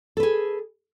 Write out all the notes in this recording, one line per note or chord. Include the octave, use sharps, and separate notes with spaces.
G#4 A4 B4